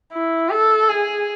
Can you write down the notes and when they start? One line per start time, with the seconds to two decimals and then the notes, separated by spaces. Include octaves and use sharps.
0.12 E4
0.50 A4
0.89 G#4